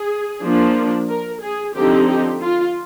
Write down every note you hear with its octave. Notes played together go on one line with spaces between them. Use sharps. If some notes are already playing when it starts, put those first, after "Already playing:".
Already playing: G#4
F3 A#3 D4
A#4
G#4
D3 F3 C4 D#4 G4
G4
F4